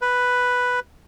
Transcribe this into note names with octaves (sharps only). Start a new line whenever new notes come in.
B4